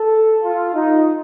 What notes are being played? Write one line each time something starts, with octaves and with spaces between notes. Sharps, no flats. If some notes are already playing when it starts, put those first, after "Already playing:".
Already playing: A4
F4
D#4